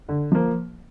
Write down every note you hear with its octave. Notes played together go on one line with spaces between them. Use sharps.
D3
F3 A#3